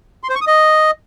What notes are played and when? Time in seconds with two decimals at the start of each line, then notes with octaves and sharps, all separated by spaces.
0.23 C6
0.29 C5
0.35 C#6
0.41 D#6
0.47 D#5